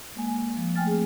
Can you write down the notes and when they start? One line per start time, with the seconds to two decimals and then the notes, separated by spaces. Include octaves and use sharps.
0.16 G#3 A#3 G#5
0.28 G#5
0.57 F3
0.76 A3 G5 G#5 F6 A6
0.87 C4 G#4